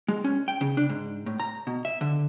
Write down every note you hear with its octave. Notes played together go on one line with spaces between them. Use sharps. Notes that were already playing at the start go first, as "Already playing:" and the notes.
G#3
C#4
G5
C#3
D4
G#2
A2
A#5
B2
E5
D3